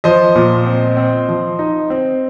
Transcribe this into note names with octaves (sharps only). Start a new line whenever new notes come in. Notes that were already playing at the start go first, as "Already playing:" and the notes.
F3 C5 D#5
A#2
C4
C4
F3
D#4
C4